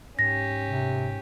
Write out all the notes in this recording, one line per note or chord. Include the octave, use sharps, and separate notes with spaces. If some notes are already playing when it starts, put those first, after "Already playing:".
G#2 C#4 G4 A#6
C3